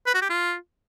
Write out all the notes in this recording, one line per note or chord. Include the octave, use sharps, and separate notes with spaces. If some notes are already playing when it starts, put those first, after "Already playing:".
B4
F#4
G4
F4